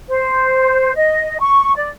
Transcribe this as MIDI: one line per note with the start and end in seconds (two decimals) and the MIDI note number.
0.09 0.95 72
0.95 1.39 75
1.40 1.73 85
1.76 1.89 74